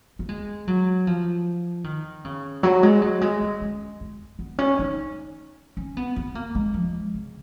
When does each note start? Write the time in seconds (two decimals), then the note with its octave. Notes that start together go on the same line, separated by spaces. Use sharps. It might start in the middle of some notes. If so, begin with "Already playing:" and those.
0.19 A#3
0.29 G#3
0.67 F#3
1.07 F3
1.84 D#3
2.24 C#3
2.63 F#3
2.83 G#3
3.02 F#3
3.21 G#3
3.41 G#3
3.61 C#4
4.01 G#3
4.39 B3
4.58 C#4
4.79 D#4
5.77 C#4
5.97 B3
6.16 B3
6.35 A#3
6.55 G#3
6.74 F3
7.14 C#3